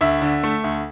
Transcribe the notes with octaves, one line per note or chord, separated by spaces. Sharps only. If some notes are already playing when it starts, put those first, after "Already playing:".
D2 E5
D3
A3
D2